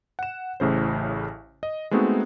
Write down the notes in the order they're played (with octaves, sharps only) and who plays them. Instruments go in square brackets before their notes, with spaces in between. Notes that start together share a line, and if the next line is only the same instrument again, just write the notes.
[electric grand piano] F#5 E7
A1 A2 C#3 C5
D#5
G#3 A3 B3 C4 D#4 F#4